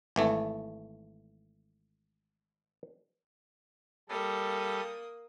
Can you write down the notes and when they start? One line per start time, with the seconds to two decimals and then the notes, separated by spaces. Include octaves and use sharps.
0.16 G#1 E3 A3
4.09 G3 A#3 A4 D#6